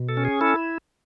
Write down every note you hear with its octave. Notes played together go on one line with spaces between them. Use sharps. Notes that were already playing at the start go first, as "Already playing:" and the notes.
Already playing: B2
A4
C#4
G#4
E4 A4